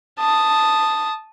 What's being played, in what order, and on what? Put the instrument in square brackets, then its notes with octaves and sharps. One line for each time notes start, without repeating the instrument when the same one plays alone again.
[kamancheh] A5 D#6